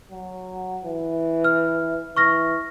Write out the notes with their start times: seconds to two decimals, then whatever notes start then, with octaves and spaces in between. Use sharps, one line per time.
0.11 F#3
0.84 E3
1.44 F6
2.16 E3 C#6 F6 A#6